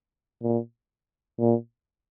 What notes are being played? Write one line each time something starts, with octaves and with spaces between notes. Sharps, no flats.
A#2
A#2